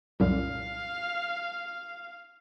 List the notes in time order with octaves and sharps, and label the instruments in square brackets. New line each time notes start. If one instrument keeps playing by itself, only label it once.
[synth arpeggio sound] C2 F#2 A#2 [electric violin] F5